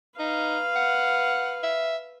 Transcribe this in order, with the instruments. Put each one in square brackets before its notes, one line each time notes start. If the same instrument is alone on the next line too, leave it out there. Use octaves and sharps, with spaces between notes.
[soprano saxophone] D#4 [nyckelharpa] B4 F5
[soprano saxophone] F#5
E5